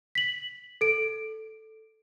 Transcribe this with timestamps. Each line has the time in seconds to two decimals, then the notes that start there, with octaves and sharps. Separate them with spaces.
0.15 B6 F#7
0.81 A4 D7